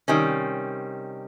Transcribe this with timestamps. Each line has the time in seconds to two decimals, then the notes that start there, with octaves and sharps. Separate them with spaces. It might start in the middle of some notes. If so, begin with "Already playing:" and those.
0.08 C3 D#3 G3 C#4